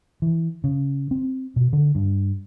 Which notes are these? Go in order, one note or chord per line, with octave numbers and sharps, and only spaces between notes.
E3
C#3
C4
B2
D3
G2